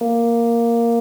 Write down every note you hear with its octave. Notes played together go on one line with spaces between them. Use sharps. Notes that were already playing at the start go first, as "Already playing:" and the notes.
A#3